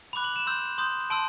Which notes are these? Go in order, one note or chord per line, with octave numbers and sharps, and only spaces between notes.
B5 D6 F#6 F7
F#7
E7
C6 E6 G6
C6 D#6 G6
A5 C6 E6 D7